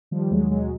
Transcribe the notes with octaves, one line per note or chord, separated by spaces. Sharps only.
D#3 F3 G3
D#2 F#3 G#3
B2 F#3 G#3